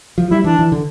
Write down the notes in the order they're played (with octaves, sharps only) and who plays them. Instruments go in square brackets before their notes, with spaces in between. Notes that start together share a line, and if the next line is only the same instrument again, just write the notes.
[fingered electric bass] F3
[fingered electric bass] G3 [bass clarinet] E4
[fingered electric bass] E3 [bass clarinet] D4
[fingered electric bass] E3
D3